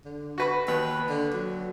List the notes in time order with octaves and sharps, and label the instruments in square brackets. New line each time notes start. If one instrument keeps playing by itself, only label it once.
[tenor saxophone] D3
[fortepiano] F#4 B4 B5
[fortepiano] D#2 [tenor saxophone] B4
[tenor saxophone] D3
F#3